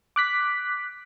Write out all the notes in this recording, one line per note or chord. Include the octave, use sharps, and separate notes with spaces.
D6 F#6 B6